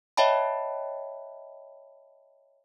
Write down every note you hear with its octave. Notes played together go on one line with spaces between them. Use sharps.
C#5 D#5 E5 G5 A5 B5